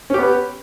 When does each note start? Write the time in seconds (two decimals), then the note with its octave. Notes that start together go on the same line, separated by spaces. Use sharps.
0.10 C#4
0.14 G4
0.19 B3
0.23 B4